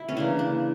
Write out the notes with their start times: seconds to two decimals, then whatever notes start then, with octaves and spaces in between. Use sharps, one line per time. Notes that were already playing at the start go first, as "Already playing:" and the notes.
Already playing: E4
0.08 C#4
0.17 C#3 E3 A#3 D4
0.39 D4